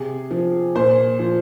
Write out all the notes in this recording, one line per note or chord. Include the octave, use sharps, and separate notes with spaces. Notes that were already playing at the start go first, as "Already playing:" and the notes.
Already playing: C3 G#4
F3
A#2 C5
F3